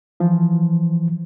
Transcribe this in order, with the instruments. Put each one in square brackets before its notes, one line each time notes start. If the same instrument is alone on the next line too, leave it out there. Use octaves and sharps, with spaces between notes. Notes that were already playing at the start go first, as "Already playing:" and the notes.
[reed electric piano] E3 F3